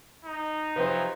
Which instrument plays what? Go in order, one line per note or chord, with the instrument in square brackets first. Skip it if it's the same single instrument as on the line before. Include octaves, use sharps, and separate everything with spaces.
[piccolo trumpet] D#4
[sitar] C3 F3 F#3 [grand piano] B4 C5